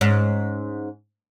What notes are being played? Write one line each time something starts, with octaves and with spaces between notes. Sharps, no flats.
G#2 C#4